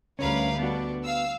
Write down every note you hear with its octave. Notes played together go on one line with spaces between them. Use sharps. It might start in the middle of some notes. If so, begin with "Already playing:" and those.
D2 G3 C#4 A#4 B4 F5
B3 D4 F#4
F5 E6